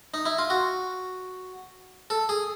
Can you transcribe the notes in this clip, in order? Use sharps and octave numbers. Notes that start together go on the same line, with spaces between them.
D#4
E4
F4
F#4
A4
G#4